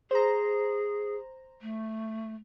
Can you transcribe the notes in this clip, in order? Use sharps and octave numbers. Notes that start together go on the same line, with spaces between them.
G#4 C5 A#5
A3